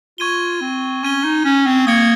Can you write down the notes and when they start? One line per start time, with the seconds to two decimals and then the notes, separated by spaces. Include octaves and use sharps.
0.18 F4 C#6 G#6 D#7 G7
0.61 C4
1.03 C#4 C#6 G#6 D#7 G7
1.24 D#4
1.44 C#4
1.66 C4
1.87 A#3 D#6 G#6 C#7